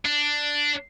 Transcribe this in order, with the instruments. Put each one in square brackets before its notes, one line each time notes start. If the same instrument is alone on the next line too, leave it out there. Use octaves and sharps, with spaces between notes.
[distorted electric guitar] D4